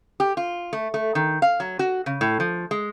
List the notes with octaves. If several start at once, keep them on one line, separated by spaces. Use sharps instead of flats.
G4
F4
A3
A3
D#3
F5
F#3
F#4
C#3
A2
F3
G#3